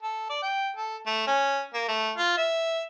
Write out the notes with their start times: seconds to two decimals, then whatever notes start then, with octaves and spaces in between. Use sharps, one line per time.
0.03 A4
0.30 D5
0.43 G5
0.76 A4
1.06 A3
1.27 C#4
1.74 A#3
1.88 A3
2.17 F4
2.37 E5